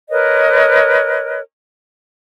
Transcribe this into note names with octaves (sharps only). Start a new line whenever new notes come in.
A#4 B4 C#5 D#5